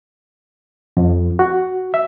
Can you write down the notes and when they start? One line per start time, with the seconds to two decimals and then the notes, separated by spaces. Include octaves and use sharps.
0.97 F2
1.39 F#4
1.94 E5